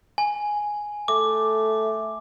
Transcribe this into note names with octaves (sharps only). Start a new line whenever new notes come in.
G#5
A3 D6